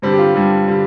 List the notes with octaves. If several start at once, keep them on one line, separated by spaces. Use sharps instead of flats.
G2 D3 G3 C4
G4
F4
G2 D3 G3
D3 G3